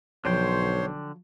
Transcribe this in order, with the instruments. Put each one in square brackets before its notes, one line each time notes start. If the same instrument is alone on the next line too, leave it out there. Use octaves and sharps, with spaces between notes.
[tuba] B1 [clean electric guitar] D3 G5 [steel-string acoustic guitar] F3 F#3 [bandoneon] C5 C#5 C6